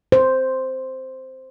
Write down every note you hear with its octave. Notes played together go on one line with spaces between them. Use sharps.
C5